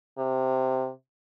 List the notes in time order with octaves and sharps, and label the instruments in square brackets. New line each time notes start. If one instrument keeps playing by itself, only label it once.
[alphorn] C3